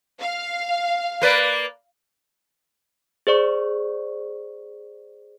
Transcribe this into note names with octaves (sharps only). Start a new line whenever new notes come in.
F5
A#3 B4 D5
G#4 C5 D5 C#6